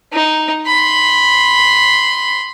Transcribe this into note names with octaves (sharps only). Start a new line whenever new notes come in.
D#4
B5 C6